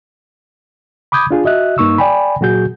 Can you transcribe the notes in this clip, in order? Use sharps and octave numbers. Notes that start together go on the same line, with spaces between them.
B5 D6 D#6 G6 G#6
D4 F4 G#4
F#4 D#5 E5 F#6
G2 A#3 D#4 C#6 E6
D5 G5 G#5 B5
A#2 F#3 F#4 G#4 G6